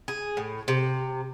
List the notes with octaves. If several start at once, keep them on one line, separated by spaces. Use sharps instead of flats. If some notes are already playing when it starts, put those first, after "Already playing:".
G#4
A2
C3